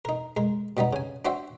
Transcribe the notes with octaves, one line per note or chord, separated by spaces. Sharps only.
D#4 A#4
G#3 A#4
B2 G3 B3 D#4
C#3 G#5
D4 F#4 C5 E5 G5